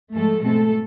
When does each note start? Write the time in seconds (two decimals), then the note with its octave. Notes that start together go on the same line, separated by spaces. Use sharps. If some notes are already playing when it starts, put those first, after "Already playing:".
0.14 G#2 F3 G#3 A3 A4
0.43 B2 G#3 A3 C4 A4